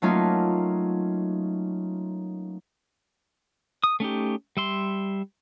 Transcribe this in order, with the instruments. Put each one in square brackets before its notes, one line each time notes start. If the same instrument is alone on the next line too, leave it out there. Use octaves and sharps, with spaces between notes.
[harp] F#3 A3 A#3 C#4 D#4 F4
[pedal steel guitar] D#6
A3 C#4 D#4 G4
G3 E5 C6